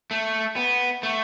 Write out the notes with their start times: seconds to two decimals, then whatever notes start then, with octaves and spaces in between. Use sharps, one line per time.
0.11 A3
0.56 B3
1.03 A3